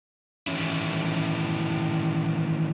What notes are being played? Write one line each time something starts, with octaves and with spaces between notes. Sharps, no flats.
D#3 E3 C#4 E4